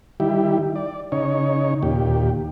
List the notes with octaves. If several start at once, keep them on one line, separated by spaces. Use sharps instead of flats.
D#3 G3 E4 G4
D5
C#3 D#4 C#5
D#2 A#2 G4